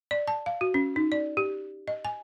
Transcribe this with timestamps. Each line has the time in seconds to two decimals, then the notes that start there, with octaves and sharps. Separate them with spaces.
0.11 D5
0.27 A5
0.46 F5
0.61 F#4
0.74 C#4
0.96 D#4
1.12 D5
1.37 G4
1.88 D#5
2.05 G#5